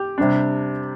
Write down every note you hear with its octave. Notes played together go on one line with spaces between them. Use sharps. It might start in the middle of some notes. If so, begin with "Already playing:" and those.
Already playing: G4
C3 G3 D4